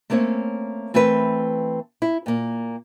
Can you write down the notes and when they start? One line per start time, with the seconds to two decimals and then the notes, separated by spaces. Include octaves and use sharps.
0.10 A3 A#3 C4 C#4 C#5
0.94 E3 A3 C4 A#4 B4
2.02 E4
2.26 A#2 A#3